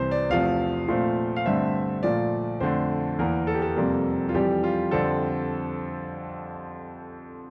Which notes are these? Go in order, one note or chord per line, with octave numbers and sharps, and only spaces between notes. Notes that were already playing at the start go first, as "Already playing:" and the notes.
Already playing: C2 C3 E3 C5
D5
E2 C3 F3 A3 F5
A#2 F3 A3 C4
F5
G2 D3 A3 C4 E5
A#2 F3 A3 D5
F2 D3 A3 C5
E2 E3 A#3 A#4
A4
G4
A4
F2 C3 G3 A#3
F4
F2 E3 G3 G4
F4
F2 D3 G3 C4 A4